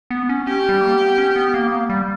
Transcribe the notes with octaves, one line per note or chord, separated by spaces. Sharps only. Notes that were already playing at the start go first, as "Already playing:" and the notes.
B3
C#4
C#4 G4
G3
A#3
B3
C#4
B3
A#3
B3
A#3
G3